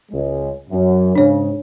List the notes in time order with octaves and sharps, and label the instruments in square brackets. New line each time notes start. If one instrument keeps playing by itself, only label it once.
[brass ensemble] C#2 G#3
F#2
[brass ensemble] G#2 C#3 [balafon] D4 C#5